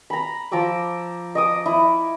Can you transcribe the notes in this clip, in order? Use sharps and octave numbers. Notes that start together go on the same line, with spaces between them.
A#5 B5
F3 A#5 D6 E6
D#5 D6 D#6
E4